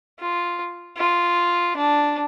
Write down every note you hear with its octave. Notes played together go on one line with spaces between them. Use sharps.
F4
F4
D4